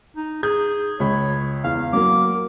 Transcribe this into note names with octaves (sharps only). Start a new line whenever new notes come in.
D#4
G#4 G6
C#2 C#5 B5
E2 F5
F#3 A#3 D6